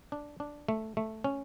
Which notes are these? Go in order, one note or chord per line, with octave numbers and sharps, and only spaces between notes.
D4
D4
A3
A3
C#4